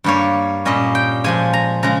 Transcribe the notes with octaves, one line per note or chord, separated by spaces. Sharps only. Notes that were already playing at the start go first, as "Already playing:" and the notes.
G2 G3 A#3 C#5
A#2 G3 C#4 D#5
G5
A#2 F3 G#3 G#5
A#5
C#3 G#3 A#5